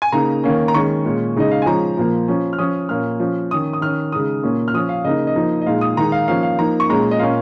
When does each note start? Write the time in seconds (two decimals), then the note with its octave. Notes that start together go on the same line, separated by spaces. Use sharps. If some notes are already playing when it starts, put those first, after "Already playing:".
0.02 G#5
0.12 C#3 A#3 D#4 A#5
0.43 D#3 A#3 C#4
0.68 A#5
0.74 D#3 G#3 C#4 C#6
1.04 A#2 G#3 C#4
1.36 C#3 G#3 D#4 D#5
1.52 F5
1.62 G#5
1.66 F3 G#3 C#4 A#5
1.97 A#2 F3 A#3
2.28 F3 C#4
2.53 F6
2.58 F3 C#4 D#6
2.89 A#2 A#3 C#4 F6
3.20 F3 C#4
3.51 D#3 C#4 D#6
3.73 D#6
3.81 D#3 C#4 F6
4.12 C#3 G#3 D#4 D#6
4.43 A#2 A#3 C#4
4.68 F6
4.74 F3 C#4 D#6
4.89 F5
5.04 C#3 A#3 D#4 D#5
5.27 D#5
5.36 F3 A#3 D#4
5.61 D#5
5.66 A#2 G#3 D#4 F5
5.81 D#6
5.96 D#3 G#3 D#4 A#5
6.12 F5
6.28 F3 A#3 C#4 F5
6.43 F5
6.59 F3 A#3 D#4 A#5
6.80 C#6
6.89 A#2 G#3 C#4 A#5
7.11 D#5
7.19 A#2 A#3 C#4 F5